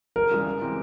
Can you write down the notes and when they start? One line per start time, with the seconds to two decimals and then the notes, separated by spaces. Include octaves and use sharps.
0.16 F#1 A#4
0.31 F#2 C#3 E3 G3
0.46 C#2
0.61 C3 E3 G#3 C4